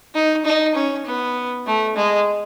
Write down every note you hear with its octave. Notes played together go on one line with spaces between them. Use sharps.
D#4
D#4
C#4
B3
A3
G#3